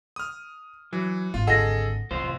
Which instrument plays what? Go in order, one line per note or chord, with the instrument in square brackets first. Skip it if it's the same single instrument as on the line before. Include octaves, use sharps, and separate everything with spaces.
[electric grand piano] D#6 F6
[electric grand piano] E3 [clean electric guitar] F#3
[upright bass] G#1 D4 [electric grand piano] F4
[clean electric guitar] D2 [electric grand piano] G#4 A4 D#5 [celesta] F#5 A#6
[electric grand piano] A1 [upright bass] F#2 C3 [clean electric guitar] F4 C5